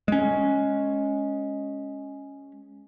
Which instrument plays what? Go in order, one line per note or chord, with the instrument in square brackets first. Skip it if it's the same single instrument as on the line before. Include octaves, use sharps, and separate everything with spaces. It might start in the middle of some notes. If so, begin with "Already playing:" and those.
[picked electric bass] G#3 C#4